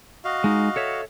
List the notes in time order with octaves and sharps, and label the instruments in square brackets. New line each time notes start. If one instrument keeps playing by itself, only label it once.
[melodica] F#4 D#5 F5
[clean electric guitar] G#3 D#4
A4 C#5 E5